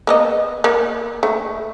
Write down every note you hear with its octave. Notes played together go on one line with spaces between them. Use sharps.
A#3 B3 D#5
A#3
A3